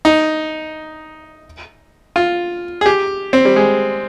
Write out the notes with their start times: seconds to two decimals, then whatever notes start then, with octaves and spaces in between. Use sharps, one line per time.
0.05 D#4
2.16 F4
2.81 G#4
2.86 G4
3.33 C4
3.45 G3
3.56 G#3